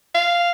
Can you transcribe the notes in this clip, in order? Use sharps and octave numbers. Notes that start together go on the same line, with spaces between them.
F5